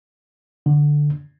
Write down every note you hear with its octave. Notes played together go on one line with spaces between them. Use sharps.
D3